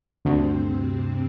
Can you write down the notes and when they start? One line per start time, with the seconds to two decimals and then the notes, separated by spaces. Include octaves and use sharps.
0.25 D2 G2 C3 C4